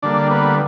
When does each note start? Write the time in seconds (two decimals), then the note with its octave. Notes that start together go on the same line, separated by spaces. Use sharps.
0.03 D3 G3 A#3 D4 D5
0.30 B3 B4